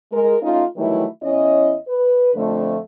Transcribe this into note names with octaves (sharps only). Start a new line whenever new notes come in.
G#3 A#4
A3 C#4 D#4 F4
D#3 E3 F#3 G3 A3 E4
E2 C#4 E4 C#5 D#5
B4
F2 D3 F3 A3